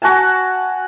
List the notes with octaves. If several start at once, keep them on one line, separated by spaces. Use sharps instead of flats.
F#4 F#5 G#5 A5